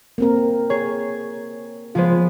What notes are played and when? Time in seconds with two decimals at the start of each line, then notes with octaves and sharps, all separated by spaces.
0.18 A#3 C4 A#4
0.70 G#4 C#5
1.95 F3 G#3 B3 F4 C5